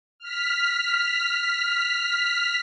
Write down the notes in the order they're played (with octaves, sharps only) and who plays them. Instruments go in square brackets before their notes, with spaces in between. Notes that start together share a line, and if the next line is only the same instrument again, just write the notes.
[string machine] F6 B6